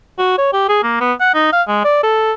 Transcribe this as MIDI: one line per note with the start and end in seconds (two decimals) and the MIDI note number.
0.19 0.38 66
0.38 0.49 73
0.53 0.67 67
0.69 0.79 68
0.83 0.97 58
1.01 1.13 59
1.21 1.31 78
1.35 1.49 63
1.53 1.63 77
1.68 1.81 56
1.85 2.00 74
2.03 2.33 69